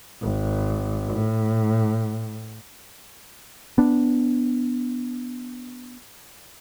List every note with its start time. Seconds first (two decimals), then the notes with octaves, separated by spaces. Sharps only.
0.22 G#1
1.14 A2
3.78 B3 D4